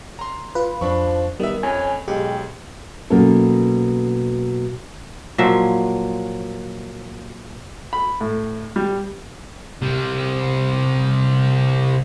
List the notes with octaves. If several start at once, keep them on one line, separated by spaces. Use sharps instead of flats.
A#5 C6
F4 B4
F2 F3 D4 B5 C#6
D#3 G3 B3 E5
F2 C#4 G#5
B1 G#3 G4
B2 F#3 A#3 C#4 A4
A#2 F3 F#3 E5
B5
A2
G3
C3 G3